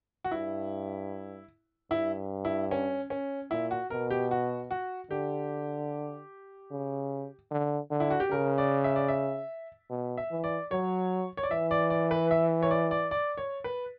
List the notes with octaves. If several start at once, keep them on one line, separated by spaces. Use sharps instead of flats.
F#4
G2 E4
G2 E4
E4
C#4
C#4
A#2 E4
F#4
B2 A#4
G4
F#4
F#4
D3 G4
C#3
D3
D3
E4
F#4
G4
C#3 A#4
D5
E5
D5
E5
B2
E5
E3
D5
F#3 C#5
C#5
D5
E3 E5
D5
D5
B4
E5
C#5
D5
D5
D5
C#5
B4